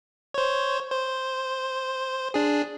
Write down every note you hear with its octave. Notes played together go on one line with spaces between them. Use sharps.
C5 C#5
C5
D4 G#4